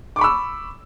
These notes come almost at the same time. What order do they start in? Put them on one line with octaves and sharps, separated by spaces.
D6 C#6 B5 E6